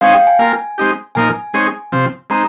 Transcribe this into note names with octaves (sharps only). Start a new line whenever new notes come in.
G#3 C4 D#4 G#4 C#5 F5
G5
G#5
A#3 F4 A#4 G#5
G#3 C4 D#4 G4
A#2 F3 A#3 D#4 A#4 G#5
G#3 C4 D#4 G#4 C#5
C3 F3 C4
G#3 C4 D#4 A#5